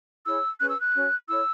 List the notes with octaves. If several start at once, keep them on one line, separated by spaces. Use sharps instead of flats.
E4 G#4 C#5 E6
C#4 G#4 B4 F#6
E6
F#6
C#4 F#4 C#5
E4 A4 C#5 E6